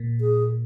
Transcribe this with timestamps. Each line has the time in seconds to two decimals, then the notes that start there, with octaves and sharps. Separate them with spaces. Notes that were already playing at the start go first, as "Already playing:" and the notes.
Already playing: A#2
0.20 G#4